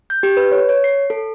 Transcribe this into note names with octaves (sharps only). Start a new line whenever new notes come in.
G6
G4
B4
C#5
C#5
C7
A4